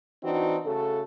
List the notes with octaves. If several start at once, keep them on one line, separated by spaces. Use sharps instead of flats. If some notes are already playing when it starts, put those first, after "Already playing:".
E3 C4 D4 D#4 F#4
C#3 A3 F#4 A4